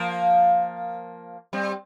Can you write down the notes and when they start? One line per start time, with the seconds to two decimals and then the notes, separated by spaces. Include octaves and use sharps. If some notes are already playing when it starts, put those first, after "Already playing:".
Already playing: F3 A#3
1.53 G3 C4